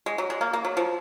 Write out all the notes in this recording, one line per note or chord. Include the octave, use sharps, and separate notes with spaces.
G#3
F#3
G#3
A#3
A#3
F#3
F3